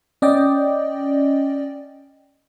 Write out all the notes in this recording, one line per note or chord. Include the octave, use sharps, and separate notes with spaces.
C#4 D5 D#5 G5